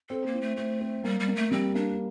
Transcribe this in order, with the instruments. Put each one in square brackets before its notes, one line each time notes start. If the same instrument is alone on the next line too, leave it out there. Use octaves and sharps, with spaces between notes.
[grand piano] C4 [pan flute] A4
[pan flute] A#3
[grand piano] E4
[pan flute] A3
[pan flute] A3 [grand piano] C4
[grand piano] C4
[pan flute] G3 [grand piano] A#3
[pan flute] G3
[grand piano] A#3
[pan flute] A3
[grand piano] G3 [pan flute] C4
[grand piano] A#3 [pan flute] D4